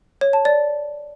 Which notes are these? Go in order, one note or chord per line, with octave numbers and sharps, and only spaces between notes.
C#5
A5
D5